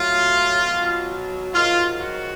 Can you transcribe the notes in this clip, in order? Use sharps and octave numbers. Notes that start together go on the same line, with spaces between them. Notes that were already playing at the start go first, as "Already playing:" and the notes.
Already playing: A2 F#3 F4
B2 F#3
G#2 D#3 F#3 F4
F#4